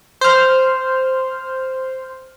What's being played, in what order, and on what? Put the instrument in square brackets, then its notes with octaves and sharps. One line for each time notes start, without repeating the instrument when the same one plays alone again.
[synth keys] C5 F6